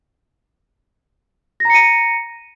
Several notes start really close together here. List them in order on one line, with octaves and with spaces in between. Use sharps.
A#6 A#5 C#7 D#7